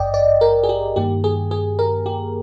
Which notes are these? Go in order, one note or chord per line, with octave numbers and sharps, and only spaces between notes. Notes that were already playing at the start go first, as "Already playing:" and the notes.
Already playing: G#1 G2 D5 D#5 G5
D5
A#4
G#4
G4
G2 D#3 A#3 G4
G#4
G#4
A#4
G4